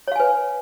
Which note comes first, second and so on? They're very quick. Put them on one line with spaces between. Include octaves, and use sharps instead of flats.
C#5 F5 G#5 B4